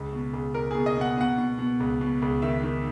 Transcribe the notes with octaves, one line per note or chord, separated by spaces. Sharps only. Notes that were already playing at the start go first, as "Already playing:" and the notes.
Already playing: C#2
B2
C#2
C#2 A#4
G#4
B2
D#5
B2 F#5
B2 F#5
B2
B2
C#2
B2
C#2
D#3 E5
D#3